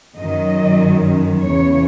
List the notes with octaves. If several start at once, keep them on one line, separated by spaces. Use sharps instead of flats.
F#2 D#3 F#3 D#5
E2 C#3 E3 C#5